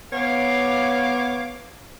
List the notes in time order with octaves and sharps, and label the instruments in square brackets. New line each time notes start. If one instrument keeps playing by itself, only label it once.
[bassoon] B3 [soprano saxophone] C#5 [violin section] F5 D6